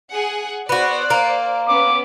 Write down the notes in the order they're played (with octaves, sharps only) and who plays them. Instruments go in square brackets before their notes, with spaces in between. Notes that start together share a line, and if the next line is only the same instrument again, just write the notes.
[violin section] G#4 F#5
[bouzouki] B3 F#4 [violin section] C5 D5
[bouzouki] A#3
[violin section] B3 C#4 [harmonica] D6